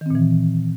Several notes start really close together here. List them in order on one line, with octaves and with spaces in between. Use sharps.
D#3 C4 A#2 E3